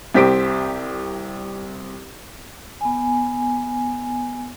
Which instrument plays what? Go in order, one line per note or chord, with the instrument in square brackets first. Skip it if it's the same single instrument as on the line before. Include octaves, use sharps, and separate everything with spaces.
[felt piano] C2 C4 G4 B6 D7
[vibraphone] B3 G#5